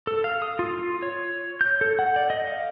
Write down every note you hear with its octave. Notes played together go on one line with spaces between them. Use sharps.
A4
F5
D#6
F4
F4
C#5
G6
A4
F#5
D5
D#5
F5